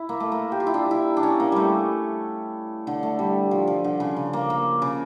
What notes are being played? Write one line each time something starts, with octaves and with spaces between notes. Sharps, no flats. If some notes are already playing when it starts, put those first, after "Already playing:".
Already playing: E4
A#3
A3
A#3
G4
F4
E4
D4
E4
D4
C#4
A#3
G3 A3
D3
A3
G3
F3
F3
D3
C#3
C#3
A#3
A#3
C#3